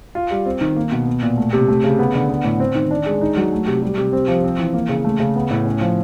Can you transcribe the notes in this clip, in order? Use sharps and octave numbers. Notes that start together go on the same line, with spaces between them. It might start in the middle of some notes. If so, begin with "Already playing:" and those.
F4
G3
C4
D#3
A#3
B2
B3
A#2
A3
C3
A3
C#3
B3
D3
B3
A2
C4
D#3
D4
G#3
D#4
F#3
A3
C3
G3
C3
C4
F3
C4
E3
A#3
C#3
A3
C#3
B3
A2
C#4
F3